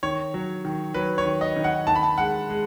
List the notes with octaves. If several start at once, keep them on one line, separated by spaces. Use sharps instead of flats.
D#3 C#5
F#3
D#3
F#3 B4
C#5
D#3
D#5
D#3
F#5
D#3 A5
B5
A5
G#3 F#5
G#3